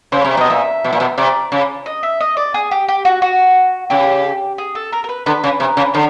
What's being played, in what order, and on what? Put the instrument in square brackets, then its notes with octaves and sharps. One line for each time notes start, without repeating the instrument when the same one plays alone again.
[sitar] C#3 [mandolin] C5
[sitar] C3 [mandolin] C#5
[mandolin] D5
[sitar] B2 [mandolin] D#5
[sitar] A#2 [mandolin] E5
[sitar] B2
A#2
B2
[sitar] C3 [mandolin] D5
[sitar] C#3
[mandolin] D#5
E5
D#5
D5
G#4
G4
G4
F#4
F#4
[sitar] C#3 [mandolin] G4
[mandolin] G#4
A4
A#4
A#4
B4
[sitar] D3 [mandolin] B4
[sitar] C#3
C3
C#3
[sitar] D3 [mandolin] C#5